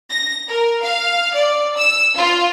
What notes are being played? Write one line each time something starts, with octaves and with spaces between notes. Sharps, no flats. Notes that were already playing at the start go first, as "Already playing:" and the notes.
A#6
A#4
F5
D5
E6
F4